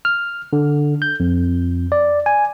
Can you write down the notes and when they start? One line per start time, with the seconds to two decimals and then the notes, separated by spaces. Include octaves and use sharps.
0.05 F6
0.53 D3
1.02 G6
1.20 F2
1.92 D5
2.26 G#5